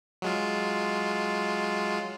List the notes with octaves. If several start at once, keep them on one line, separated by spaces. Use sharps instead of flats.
F#3 G#3 F4